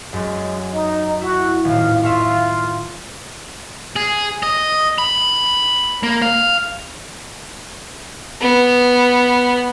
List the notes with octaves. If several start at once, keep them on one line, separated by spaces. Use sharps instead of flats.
F#2 G#3
D#4
E4 F#4
D#1 A2 F5
F4 E5 F5 C#6
G#4
D#5
B5
A#3
F5
B3